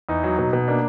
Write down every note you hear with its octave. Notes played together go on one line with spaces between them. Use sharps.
E2 D#4
F#3
B2
B2
A#3 D4